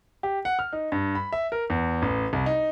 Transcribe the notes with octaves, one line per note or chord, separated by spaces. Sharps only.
G4
F#5
F6
D#4
G2
B5
E5
A#4
E2
A1
C2
D#4